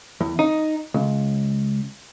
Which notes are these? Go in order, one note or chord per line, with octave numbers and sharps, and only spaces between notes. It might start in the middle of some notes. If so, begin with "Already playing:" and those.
E2
D#4
C#2